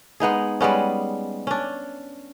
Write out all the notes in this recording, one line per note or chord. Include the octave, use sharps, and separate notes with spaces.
G#3 B3 D#4 G#4
G3 G#3 B3 C#4
C#4 D4